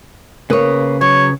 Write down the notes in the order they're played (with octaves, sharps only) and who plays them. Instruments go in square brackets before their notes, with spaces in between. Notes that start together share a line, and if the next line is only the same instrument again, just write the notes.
[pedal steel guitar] C#3 B4 D#6 [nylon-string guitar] A#3 C#5
[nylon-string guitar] F#3 [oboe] C#5